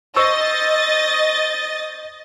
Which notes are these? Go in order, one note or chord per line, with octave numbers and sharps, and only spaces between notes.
C5 D#5 C#6 E6 A6